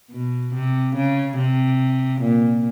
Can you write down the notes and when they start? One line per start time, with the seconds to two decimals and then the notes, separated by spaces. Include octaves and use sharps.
0.11 B2
0.54 C3
0.96 C#3
1.37 C3
2.22 A#2